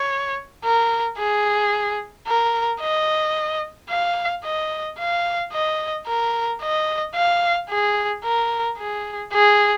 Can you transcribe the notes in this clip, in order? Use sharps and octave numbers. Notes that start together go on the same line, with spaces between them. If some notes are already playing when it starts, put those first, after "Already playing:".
Already playing: C#5
A#4
G#4
A#4
D#5
F5
D#5
F5
D#5
A#4
D#5
F5
G#4
A#4
G#4
G#4